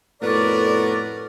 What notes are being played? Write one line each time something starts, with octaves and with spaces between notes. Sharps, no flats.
F2 A2 A3 B3 F#4 A#4 D5